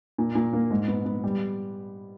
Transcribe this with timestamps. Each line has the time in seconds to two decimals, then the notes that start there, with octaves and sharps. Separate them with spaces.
0.18 A#2
0.35 A#2
0.53 A#3
0.71 G#2
0.88 B3
1.05 B3
1.24 G3